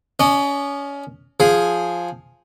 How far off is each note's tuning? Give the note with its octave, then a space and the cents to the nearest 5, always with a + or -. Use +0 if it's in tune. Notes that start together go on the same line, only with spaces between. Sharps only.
C#4 +25 D#5 -30
F3 +0 G#4 +0